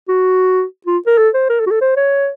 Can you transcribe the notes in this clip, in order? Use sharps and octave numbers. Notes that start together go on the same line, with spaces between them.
F#4
F4
A#4
A4
C5
A#4
A4
F#4
A4
C5
C#5